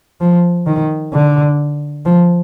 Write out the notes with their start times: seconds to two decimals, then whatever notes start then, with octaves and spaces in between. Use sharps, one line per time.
0.21 F3
0.66 D#3
1.13 D3
2.05 F3